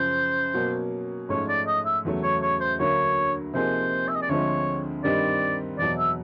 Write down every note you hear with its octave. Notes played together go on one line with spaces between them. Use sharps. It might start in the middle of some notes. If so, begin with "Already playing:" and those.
Already playing: F#2 C#3 F3 C5
B2 F#3 A#3 C#4 F#4
G#2 F3 A3 C#4 C#5
D5
D#5
E5
E2 C#3 F#3 A3
C#5
C#5
C5
D2 D3 F#3 A#3 C#5
C3 F3 A#3 D#4 G#4 C5
E5
D#5
D5
D2 D3 F3 G#3 C4 C#5
G2 D#3 G3 C4 D#4 D5
E2 B2 F#3 D5
E5